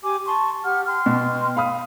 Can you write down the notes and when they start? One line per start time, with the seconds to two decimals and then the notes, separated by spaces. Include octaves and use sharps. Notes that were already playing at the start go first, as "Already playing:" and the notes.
0.03 G4 G#5 D6
0.26 A5 C6 C#6
0.64 G4 F#5 F6
0.86 G5 C6 F6
1.06 B2
1.57 F5 B5 D#6